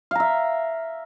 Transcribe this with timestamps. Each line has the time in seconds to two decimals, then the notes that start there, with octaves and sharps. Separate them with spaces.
0.11 F5
0.15 A#5
0.20 E5